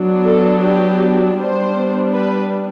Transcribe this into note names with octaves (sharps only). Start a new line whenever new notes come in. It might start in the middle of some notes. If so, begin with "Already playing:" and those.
Already playing: F#3 B3 D4
A4
G4
G3 B3 D4 C5
B4